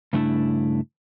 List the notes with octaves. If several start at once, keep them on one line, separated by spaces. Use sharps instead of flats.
G2 C#3 A3 D4 E4